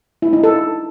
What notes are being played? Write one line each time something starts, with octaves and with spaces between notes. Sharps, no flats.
E4
D#4
A4